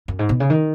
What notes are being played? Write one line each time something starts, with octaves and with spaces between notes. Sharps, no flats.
F#2
G#2
B2
C#3
D#3